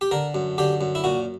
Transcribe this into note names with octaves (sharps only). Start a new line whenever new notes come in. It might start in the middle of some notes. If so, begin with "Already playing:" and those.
G4
D3 A#4
F#2
D3 G4
F#2
E4
A#2 F#4